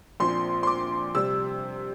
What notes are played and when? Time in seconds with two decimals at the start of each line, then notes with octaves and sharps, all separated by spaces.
0.20 A#1 A#2 F3 C4 C6
0.63 C6
0.67 D6
1.15 C3 G3 E6